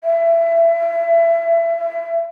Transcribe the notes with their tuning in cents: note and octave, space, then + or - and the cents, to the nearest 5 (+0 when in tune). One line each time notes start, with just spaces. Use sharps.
E5 +25